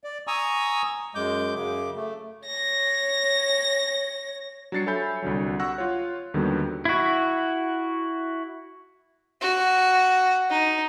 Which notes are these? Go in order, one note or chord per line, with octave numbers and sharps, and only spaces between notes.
D5
G#5 A#5 C#6 D#6 E6
F#2 G#3 D6 G6
F#2 C#3 D6
A3
C#5 A#6
F#3 G3 D4 A6 C7 C#7
A4 C#5 E5 G#5 B5 G6
C2 D3 F#3
F#5 C#6 E6 F#6 A#6
F4 C#5
D#2 D3 D#3 F#3 G3 B3
E4 F#4
F#4
D#4